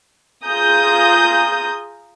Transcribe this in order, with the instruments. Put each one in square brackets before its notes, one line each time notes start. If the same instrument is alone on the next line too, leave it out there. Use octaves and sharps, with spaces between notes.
[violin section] F4 G#4 A#5 D#6 G6